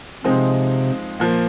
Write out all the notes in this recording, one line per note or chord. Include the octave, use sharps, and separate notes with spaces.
C3 F3 G#3 C4 D#4
A#2 F3 A#3